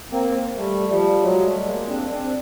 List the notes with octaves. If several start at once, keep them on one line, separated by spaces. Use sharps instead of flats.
A#3 C4
G3 A3
F3 G3
F#3 G#3
G3 A3
G#3 A#3
C4 D4
C4 D4